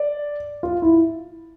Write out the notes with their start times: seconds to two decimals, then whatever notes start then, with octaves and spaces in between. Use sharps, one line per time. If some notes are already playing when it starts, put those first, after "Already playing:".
Already playing: D5
0.63 F4
0.82 E4